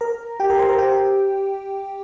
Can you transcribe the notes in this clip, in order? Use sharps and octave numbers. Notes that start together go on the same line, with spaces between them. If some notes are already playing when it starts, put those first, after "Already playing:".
A#4 A#5
G4 G5
A#4 A#5
C5 C6
A#4 A#5
G4 G5